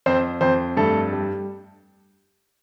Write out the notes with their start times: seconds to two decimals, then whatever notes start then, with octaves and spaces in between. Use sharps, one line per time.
0.06 F2 C4 C5
0.41 F2 C4 C5
0.77 G2 A3 A4
1.12 G3